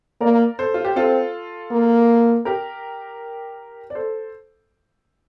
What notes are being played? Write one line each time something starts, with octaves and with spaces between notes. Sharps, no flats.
A#3 A#4 D5
A4 C5
F4
G4
C4 F4 A4
A#3
G4 A#4
D5
A4 C5